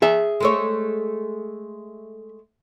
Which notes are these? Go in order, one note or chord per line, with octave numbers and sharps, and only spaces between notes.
G#4 E5
G#3 A3 C#5